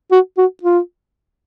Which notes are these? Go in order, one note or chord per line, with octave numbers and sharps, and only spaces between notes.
F#4
F#4
F4